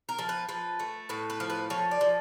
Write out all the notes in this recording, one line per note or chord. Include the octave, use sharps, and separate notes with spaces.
A#4
F3
B4
F3 B4
A3
A2 B4
B4
F3
B4
F3 C#5
D5
F3